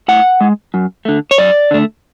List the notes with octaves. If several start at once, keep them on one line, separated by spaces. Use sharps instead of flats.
A2 F#5
G#3
F#2
D3 A3
C#5
F#2 D5
D3 A3